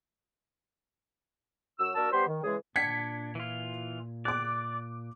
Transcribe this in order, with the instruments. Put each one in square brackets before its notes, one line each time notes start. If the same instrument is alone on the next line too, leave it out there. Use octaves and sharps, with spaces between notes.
[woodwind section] F#2 F#3 F#4 E6
A#3 D4 F#4 A#4 A5 E6
G3 B3 G4 B4 C5 C6
D#3
C#3 E3 G#3 G#4
[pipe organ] A#2 [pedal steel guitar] D4 [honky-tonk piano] G#6 B6 C#7
[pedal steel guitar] E3 F4
[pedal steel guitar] D5 [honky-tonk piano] D6 F#6